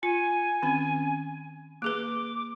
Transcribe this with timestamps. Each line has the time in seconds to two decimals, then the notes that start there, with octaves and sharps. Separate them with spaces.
0.03 F4 G#5
0.62 D#3 C4 C#4
1.82 A#3 G#4 B4 D6